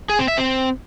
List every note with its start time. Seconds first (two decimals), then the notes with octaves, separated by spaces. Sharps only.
0.09 G#4
0.19 C4
0.28 E5
0.38 C4